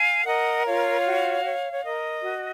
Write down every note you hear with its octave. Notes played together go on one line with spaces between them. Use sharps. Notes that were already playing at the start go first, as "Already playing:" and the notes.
Already playing: F5 G#5
A#4 D#5 F#5
F4 C#5 F5
F#4
C#5
C#5
A#4 D#5
F#4